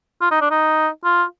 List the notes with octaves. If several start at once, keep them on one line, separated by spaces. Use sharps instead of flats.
F4
D#4
D4
D#4
F4